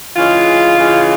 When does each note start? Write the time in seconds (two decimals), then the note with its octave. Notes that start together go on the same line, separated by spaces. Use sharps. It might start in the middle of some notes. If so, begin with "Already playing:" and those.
0.17 C#3 E3 G#3 C#4 F4
0.78 C#3 E3 G#3 C#4